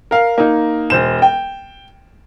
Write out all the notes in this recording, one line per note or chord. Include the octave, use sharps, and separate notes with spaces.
A#4 F5
A#3 D#4
E1 C5 E7
G5